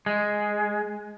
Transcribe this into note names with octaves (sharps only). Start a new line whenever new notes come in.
G#3